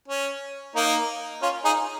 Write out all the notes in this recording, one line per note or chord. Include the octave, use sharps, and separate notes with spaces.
C#4
A#3 D#4
C#4 F4
D#4 G#4